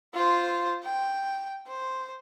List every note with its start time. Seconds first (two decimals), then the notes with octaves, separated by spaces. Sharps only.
0.14 F4 C5
0.84 G5
1.68 C5